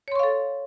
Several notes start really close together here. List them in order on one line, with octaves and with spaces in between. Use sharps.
C#5 C6 C#6 F5 A4